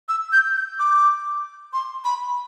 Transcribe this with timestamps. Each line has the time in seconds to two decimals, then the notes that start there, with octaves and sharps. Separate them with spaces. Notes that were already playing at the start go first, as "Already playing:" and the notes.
0.09 E6
0.32 G6
0.56 G6
0.79 D6
1.73 C6
2.04 B5